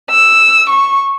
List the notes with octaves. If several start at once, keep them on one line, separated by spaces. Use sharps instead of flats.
E6
C#6